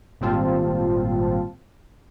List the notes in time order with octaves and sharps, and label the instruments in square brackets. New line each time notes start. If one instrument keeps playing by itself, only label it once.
[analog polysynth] G#1 A#2 G3 C4 F4 A5